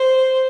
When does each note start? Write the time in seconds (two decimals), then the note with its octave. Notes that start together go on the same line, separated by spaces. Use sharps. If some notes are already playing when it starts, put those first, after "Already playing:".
Already playing: C5